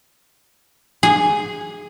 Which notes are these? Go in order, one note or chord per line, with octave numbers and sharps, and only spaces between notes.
G#4